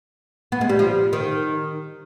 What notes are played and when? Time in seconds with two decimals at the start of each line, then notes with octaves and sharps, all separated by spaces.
0.52 B3
0.61 G#3
0.69 G3
0.79 F3
1.13 D#3